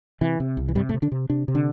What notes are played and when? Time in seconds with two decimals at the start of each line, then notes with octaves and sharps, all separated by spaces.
0.21 C3 E3
0.40 C3
0.57 C2
0.69 E3
0.75 G2 C3 G3
0.89 A2 A3
0.94 C3
1.02 D3 D4
1.12 C3
1.30 C3 D4
1.48 C3
1.55 D3 D4